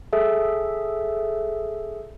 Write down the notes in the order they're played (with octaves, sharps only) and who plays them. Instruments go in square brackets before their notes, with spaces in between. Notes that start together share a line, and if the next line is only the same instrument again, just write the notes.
[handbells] G#4 A4 E5